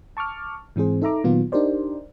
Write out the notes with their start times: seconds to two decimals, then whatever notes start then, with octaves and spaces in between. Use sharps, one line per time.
0.17 A5 C#6 D6 F6
0.76 G#2 E3 C4 G#4 C5
1.02 D#4 A4 E5 A#5 D6
1.24 A#2 D#3 F#3 B3 F4
1.52 D4 D#4 G4 A#4 C5 D5